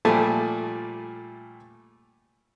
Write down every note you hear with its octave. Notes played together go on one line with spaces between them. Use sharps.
A#2 F3 G3 A3 G#5 A5